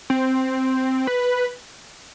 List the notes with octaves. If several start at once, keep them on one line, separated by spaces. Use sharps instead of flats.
C4
B4